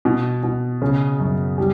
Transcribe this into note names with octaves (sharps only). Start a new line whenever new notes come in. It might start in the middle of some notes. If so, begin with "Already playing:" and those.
B2
B2
C#3
F#2
G3